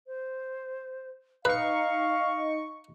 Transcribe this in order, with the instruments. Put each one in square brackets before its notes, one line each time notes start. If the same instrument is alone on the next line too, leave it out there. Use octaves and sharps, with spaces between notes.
[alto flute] C5
[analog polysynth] D#4 C#6 [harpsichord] B4 [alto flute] D#5 [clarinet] F5